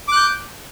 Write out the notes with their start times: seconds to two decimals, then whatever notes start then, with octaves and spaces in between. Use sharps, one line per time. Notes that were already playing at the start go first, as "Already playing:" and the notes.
0.08 D6
0.12 F#6
0.16 G6